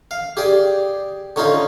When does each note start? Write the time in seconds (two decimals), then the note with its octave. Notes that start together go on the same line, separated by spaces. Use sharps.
0.11 F5
0.37 G4 G#4 D5
1.36 D3 C#4 D#4 F4